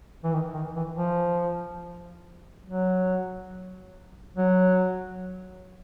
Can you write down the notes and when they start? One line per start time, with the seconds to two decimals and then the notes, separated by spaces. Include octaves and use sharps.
0.24 E3
0.33 D#3
0.54 D#3
0.76 E3
0.96 F3
2.66 F#3
4.37 F#3